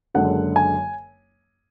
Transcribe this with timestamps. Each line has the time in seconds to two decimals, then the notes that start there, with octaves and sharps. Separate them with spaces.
0.14 F#1 F#2 D3 G#3 F#5
0.56 G#5